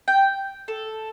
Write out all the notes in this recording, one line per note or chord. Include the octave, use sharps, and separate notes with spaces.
G5
A4